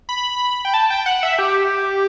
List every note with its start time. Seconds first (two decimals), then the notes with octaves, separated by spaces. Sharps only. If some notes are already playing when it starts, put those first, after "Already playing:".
0.09 B5
0.65 G5
0.74 A5
0.90 G5
1.06 F#5
1.23 E5
1.39 G4